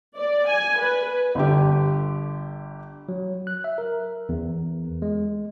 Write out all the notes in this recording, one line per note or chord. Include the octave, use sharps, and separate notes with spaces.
D5
G#5
B4
G1 D3 G4
F#3
F#6
E5
A#4
E2
G#3